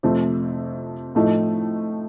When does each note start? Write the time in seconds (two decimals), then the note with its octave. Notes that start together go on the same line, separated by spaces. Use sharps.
0.03 F2 C3 F3 A3 C4
1.15 A2 F3 A3 D#4